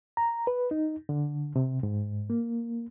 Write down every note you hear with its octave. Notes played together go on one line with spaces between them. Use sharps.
A#5
B4
D#4
D3
C3
G#2
A#3